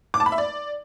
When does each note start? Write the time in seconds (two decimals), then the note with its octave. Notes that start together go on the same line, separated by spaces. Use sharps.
0.14 D6
0.20 A5
0.26 B5
0.32 E5
0.38 D5